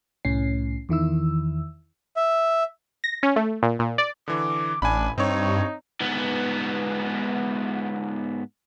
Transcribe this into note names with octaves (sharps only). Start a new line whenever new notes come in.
C2 A2 C#4 C7
E2 D#3 E4 E6
E5
A#6
C#4
A3
A#2
A#2
D5
D3 E3 D6
A1 D4 G#5 B5
G2 C4 D#4 C#5
G#2 B3